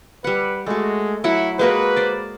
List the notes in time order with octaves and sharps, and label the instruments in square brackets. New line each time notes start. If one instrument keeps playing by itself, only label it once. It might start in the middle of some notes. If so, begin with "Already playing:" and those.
[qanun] G3 F#5 [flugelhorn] B4
[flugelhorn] G#3 [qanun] A3 F#4
[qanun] F#3 F#5 B5 [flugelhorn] E4
[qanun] G#3 A#3 F#4 [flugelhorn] B4
[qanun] C5 D5